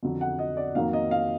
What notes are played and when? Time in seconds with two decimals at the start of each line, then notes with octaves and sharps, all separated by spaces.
0.03 F2 D3 F#3
0.21 F#5
0.39 D#5
0.57 D5
0.75 F2 D#3 F#3 A#3 F5
0.93 D#5
1.11 F5